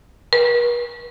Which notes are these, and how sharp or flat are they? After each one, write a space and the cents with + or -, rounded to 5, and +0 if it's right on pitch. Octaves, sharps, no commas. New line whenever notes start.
B4 -45